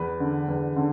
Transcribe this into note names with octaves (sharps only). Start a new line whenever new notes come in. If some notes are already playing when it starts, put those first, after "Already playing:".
Already playing: E2 B4
D3
E2
D3